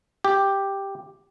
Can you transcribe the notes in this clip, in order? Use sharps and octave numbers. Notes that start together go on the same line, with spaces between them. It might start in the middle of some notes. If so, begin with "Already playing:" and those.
G4